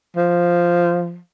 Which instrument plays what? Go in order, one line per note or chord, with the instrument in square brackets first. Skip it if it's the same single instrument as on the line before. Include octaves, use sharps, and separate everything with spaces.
[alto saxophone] F3